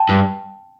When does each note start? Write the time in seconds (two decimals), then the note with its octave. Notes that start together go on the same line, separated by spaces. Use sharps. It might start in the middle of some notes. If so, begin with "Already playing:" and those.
Already playing: G5 A5
0.09 G2